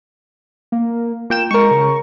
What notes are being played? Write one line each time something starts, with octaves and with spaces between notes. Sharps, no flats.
A#3
A#3 F4 G5 E7
G#3 A#4 C#6
C#3